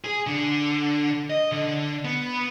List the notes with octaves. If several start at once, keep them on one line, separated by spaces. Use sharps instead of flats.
G#4
D3
D#5
D3
B3